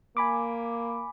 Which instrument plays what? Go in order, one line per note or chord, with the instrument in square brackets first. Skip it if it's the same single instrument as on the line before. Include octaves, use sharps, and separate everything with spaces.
[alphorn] A#3 [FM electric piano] G#5 B5 D6